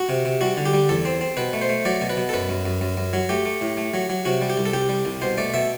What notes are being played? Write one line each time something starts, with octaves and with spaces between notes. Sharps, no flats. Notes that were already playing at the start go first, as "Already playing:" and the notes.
Already playing: F#4
C3
C3
G3 F#4
D3
G4
G3
E2 A4
C4
C4
B2 B4
A3
C5
A3
F#3 D5
B2
B4
B2
A4
F#2 B4
F#2
F#2
F#2
F#2
F#3
A3 G4
A3
A2
A3
F#3
F#3
C3 F#4
G3
G4
C2
A4
C2 G4
G3
C2
B2 C5
A3 D5
B2 E5